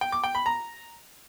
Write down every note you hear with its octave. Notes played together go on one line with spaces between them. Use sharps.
G5
D6
G5
B5
A#5